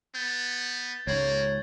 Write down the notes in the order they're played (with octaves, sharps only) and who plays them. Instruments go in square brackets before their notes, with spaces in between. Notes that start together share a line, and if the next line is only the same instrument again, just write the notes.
[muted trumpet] B3 [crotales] G6 A6 G7
[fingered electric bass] C#2 G#2 [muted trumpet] A#3 [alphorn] C#5 [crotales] G#6 F#7